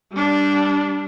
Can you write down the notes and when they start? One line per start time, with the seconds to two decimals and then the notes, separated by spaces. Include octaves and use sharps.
0.12 G3 D4